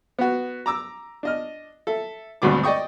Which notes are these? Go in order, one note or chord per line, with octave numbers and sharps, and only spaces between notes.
B3 F#4
A#5 D6 E6
D4 D#5 F6
A4 E5
G#1 D2 G2 B2 D6
D5 D#5 G5 C#6 D#6